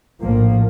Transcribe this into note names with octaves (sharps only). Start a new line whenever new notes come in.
A#1 A2 F3 A#3